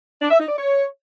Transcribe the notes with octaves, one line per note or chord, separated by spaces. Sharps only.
D4
E5
D#4
D5
C#5